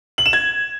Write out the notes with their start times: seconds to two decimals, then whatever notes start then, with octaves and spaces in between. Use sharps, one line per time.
0.18 F#7
0.26 E7
0.33 G#6